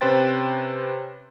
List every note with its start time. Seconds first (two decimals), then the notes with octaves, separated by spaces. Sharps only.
0.01 C3 C#4 B4 C5 G5 A6